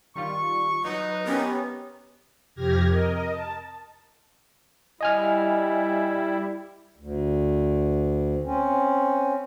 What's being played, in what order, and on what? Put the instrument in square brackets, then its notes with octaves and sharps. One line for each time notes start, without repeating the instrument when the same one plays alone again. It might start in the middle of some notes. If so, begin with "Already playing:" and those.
[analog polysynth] D#3 G3 F4 [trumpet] C#6
[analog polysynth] F#3 [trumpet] D#4 [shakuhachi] B4
[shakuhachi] B3 [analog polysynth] C#4 G4 A#4
[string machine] F2 C3 G4 F6 G#6 A#6
A#4 D#5
A5
[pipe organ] G3 E4 [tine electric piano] D#5 G#5 F6
[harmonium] D2
C4 C#4